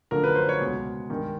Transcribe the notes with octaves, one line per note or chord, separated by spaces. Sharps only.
F#2 D3 F3 A3 A#4
B4
C5
C#5
C#2 B2 G#3
G2 D#3 G#3